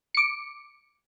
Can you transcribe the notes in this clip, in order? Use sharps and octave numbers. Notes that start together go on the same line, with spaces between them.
D6 C#7